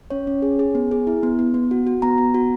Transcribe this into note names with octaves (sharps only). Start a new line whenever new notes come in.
C#4 C#5
C#4
G#4
G#4
B3
G#4
E4
B3
B3
B3
F#4
F#4
B3 A#5
B3
F#4